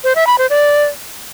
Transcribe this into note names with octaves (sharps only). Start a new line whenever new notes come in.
C5
E5
B5
C5
D5